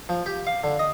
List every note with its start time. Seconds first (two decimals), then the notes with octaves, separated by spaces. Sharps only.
0.09 F3
0.26 G4
0.47 F5
0.64 D3
0.79 D#5